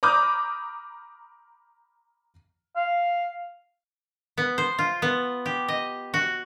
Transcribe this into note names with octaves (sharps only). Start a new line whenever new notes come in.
A#5 B5 D6 D#6 F6 G6
F5
B3
C5
F4
B3
G4
D#5
F#4